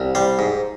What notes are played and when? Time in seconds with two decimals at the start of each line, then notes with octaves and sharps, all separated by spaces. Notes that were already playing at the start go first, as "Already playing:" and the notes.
Already playing: C2
0.15 G3 C5
0.39 G#2